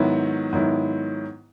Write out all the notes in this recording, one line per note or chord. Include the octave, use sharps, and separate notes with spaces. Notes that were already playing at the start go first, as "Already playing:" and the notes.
Already playing: G#2 D#3 F#3 B3 E4
G#2 D#3 F#3 B3 E4